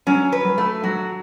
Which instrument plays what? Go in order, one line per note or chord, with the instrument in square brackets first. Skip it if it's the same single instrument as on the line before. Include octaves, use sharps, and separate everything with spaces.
[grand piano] F#3 [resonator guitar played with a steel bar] C#4
[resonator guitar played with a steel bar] B4
[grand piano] F#3
[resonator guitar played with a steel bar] A3
[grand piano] F#3 [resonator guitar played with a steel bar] F#4